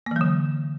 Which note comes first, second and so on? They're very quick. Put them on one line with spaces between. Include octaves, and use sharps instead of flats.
A#3 E3 F#3 D3